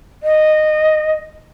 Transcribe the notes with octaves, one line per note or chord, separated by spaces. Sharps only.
D#5